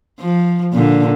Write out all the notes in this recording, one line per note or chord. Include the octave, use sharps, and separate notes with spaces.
F3
A#2 D3